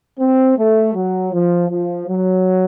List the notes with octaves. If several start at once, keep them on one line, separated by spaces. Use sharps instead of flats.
C4
A3
F#3
F3
F3
F#3